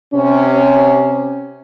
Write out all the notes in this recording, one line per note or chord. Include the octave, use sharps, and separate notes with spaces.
C3 C#4